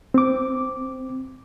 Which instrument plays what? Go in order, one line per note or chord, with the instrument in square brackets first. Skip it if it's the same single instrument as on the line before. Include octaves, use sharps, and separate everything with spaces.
[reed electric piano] C4 D6